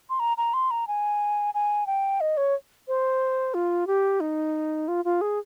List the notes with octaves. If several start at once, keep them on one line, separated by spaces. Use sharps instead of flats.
C6
A#5
A#5
C6
A#5
G#5
G#5
G5
D#5
C#5
C5
F4
G4
D#4
F4
F4
G#4